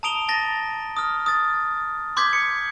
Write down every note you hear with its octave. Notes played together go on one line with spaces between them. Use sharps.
A5 A#5 D#6 D7 F7 G7
A5 A6 A#6
D#6 F6
D#6 A6
C6 D6 G6 G#6 B6
C#7